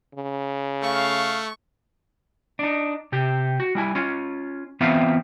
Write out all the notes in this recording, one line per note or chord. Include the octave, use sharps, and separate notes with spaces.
C#3
A3 F5 C#6
D4 D#4
C3 G4
F#4
G3 E4 G#5
C#4 F4
E3 B3 C4 F4 E5 F5